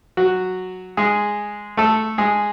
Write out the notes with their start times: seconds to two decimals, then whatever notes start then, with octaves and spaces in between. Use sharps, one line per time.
0.17 F#3 F#4
0.97 G#3 G#4
1.77 A3 A4
2.18 G#3 G#4